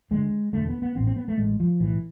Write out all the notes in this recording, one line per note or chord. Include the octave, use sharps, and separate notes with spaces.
D2 D3 G#3
E1 D2 D3 A3
B3
B3
A1 A2 C4
C4
B3
A3
A1 A2 G#3
F3
B1 A2 E3